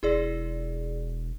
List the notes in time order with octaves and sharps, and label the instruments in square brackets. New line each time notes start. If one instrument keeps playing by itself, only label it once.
[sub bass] E1 [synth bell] E4 G#4 D5